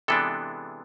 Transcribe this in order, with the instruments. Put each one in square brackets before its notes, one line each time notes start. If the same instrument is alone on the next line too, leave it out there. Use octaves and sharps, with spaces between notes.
[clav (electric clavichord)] C3 E3 G#3 B3 D4 A4